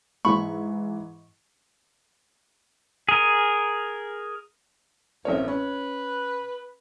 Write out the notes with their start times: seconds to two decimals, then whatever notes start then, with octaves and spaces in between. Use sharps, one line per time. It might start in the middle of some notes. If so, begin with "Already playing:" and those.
0.25 G#2 E3 B5 C#6
3.09 G#4 A#4
5.25 A1 D2 A#3 C4 C#5 E5
5.48 C#4 B4